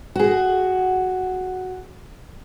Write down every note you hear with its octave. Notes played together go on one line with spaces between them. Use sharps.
F#4 G#4